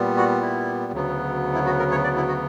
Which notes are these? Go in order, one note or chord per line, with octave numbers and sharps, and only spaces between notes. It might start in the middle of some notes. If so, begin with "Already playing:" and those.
Already playing: A#2 G3 B3
F#4
E4
D2 C#3 F#3 B3
E4
F#4
A#4
C#5
D5
E4
F#4